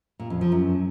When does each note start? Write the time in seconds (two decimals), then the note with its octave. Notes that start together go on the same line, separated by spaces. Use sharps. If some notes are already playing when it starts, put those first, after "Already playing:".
0.20 A#2
0.30 F2
0.41 F3
0.52 F#2